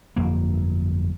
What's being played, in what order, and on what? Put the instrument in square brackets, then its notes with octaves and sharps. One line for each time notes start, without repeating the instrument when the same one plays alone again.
[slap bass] G1 F2 A#3